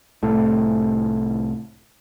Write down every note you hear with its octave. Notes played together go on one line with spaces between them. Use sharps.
C2 A2 A3